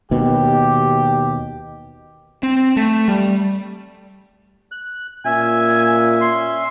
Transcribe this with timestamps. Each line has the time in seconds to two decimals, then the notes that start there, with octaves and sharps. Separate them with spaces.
0.11 D#2 B2 G4
2.43 C4
2.77 A3
3.08 G3
4.72 F#6
5.25 A#2 C#4 E5 G#5
6.21 C6